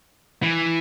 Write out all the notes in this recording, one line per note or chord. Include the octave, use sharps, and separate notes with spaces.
E3